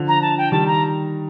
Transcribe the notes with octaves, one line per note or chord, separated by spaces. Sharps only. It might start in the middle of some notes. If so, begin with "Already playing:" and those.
Already playing: D3 F3
A#5
A5
G5
D#3 G3 A5
A#5